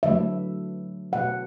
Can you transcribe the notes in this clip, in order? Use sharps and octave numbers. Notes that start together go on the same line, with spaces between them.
D3 F#3 A3 E5
B2 A3 F#5